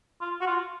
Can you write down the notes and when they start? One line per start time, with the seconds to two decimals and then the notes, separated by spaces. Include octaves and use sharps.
0.21 F4
0.41 F#4
0.47 F4